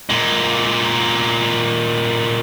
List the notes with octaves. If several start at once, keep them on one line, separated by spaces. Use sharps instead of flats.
A#2 G#3